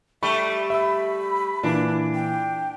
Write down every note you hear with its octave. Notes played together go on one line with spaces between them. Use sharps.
G3 A3 E5 B5 C#6
E5 B5 E6
A#2 E3 D4
G5